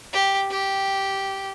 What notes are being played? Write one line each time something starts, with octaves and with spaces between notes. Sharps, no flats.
G4
G4